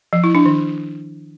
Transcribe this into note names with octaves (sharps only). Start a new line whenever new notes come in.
F3
E4
D4
D#3